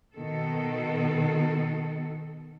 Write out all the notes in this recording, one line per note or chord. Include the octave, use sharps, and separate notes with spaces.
B2 D#3 A4